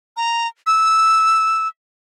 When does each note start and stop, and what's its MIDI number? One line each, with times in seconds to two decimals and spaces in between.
0.17 0.47 82
0.67 1.68 88